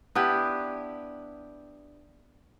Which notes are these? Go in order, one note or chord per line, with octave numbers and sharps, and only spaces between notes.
B3 D4 E4 G4